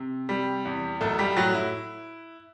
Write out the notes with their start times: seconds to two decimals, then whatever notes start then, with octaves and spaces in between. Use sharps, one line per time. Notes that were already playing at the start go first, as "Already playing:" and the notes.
Already playing: C3
0.29 C3 G3 G4
0.65 E2
1.01 B1 A3 A4
1.19 G3 G4
1.36 A2 F#3 F#4
1.54 E4